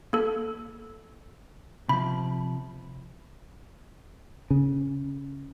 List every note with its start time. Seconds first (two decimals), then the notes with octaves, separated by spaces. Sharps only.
0.13 A#3 A4
1.89 C3 F3 B5
4.51 C#3